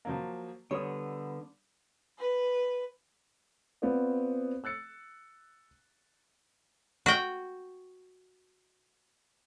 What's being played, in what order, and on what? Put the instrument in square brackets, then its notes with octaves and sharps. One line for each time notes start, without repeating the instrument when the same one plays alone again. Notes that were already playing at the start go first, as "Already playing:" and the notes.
[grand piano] F3 F#3 A#3
[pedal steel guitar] D3 B3 [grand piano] G3 D#6 [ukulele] C#5
[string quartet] B4
[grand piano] B3 C4 F4 C5 D5
E6 F#6 A6 C#7
[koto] F#4 G5